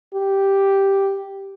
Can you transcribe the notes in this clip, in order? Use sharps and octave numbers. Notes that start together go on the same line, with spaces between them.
G4